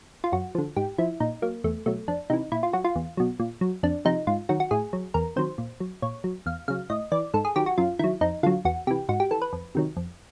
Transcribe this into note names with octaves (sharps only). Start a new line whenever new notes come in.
F4
F#2 F#4
D3 F3
G#2 G4
F3 E4
A#2 D#4
F#3 A#3
E2 A3
B2 F#3 A3
F2 D4
C3 E3 D#4
A#2 E4
F4
F#3 F#4
F4
E2
B2 F#3
A#2
F#3
F2 D4
C3 F3 D#4
G#2 F4
D#3 F#3 F#4
F#4
A2 G#4
F#3
E2 A#4
C3 D#3 F#3 C5
A#2
F#3
A#2 C#5
F#3
E2 F5
C#3 F#3 F5
A2 D#5
E3 D5
G#2 A4
G#4
D#3 F#3 G4
F#4
F#2 F4
D#3 F#3 E4
F2 D#4
D3 F#3 F4
E2 F#4
C3 E3 G4
G#2 F#4
G4
E3 A4
B4
F2
C3 D#3 F#3
F2